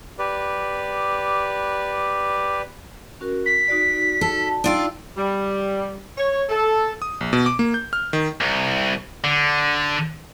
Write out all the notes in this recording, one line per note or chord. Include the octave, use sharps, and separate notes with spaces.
G4 B4 D5
C#4 F#4 A#4
B6
D#4 F#4 D5
A4
D4 D#4 F4 D5 G5 E6
G3
C#5
A4
D#6
A#1
B2
D6
A#3
G6
F6
D#3
C2
D3